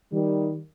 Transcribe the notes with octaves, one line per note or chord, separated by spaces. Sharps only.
D#3 G3